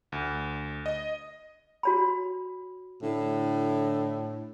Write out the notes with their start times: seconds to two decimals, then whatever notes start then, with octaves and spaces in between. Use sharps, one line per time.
0.12 D2
0.86 D#5
1.83 F#4 C#5 B5
3.02 A2 D3